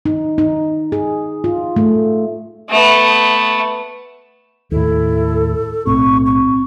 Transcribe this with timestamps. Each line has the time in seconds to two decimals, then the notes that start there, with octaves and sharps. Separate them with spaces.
0.06 D#4
0.38 D#4
0.92 G#4
1.44 F4
1.76 A3
2.69 A3 B3
4.71 D#2 A2 E4 A4
5.87 B1 A2 C4 C#6
6.26 C#6